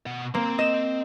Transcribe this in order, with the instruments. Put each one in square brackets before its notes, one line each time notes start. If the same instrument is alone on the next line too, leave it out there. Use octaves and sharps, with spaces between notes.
[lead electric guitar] B2 F#5
[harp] A#3 [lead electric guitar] C4 C6
[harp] D#5 E7